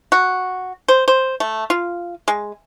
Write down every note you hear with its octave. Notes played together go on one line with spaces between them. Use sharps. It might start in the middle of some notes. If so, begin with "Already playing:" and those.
F#4
C5
C5
A3
F4
G#3